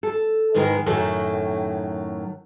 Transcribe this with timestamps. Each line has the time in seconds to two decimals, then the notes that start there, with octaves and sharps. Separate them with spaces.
0.03 A4
0.55 G#2 D#3 E3 G#3 G#4 A#4
0.86 F#2 A2 D#3 F#3 A4